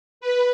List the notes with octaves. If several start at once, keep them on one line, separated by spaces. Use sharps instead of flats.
B4